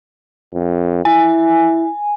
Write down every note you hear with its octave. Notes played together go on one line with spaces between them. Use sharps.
F2
E4 G#5